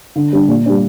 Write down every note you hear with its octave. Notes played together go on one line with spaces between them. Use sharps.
D3
G3 D4
A#2
G3 D4